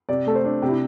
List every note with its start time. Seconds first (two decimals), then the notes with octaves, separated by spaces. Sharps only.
0.09 C3 D5
0.27 A3 A4
0.35 C5
0.44 D4
0.62 C3 G4
0.69 E4